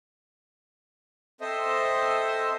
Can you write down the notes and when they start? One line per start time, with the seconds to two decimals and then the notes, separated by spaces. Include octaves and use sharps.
1.41 C4 A4 C5 D#5 E5